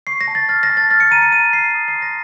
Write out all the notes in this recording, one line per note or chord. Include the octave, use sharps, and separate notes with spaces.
C#6 C7
A#6
A5
A6
F6 A6
A#6
A5
A6
F6 A6
C#7
A#5 D#7
C#7
A#5 D#7
F6 C7
D#6
C7
C6
A#6